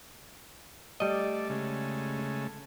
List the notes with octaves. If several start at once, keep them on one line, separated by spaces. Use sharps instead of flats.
G3 A3 D5 D#5
C#3 G#3 A3